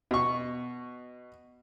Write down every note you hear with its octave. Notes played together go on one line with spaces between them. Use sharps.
B2 C#6